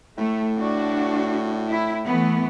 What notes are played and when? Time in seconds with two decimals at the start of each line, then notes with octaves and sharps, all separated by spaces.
0.18 A2 A3
0.57 D4 F#4
1.69 E4
2.07 E3 A3 B3